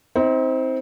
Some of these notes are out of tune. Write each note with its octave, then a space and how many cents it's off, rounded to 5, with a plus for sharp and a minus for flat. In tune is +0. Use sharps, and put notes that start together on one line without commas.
C4 +0 D#4 +45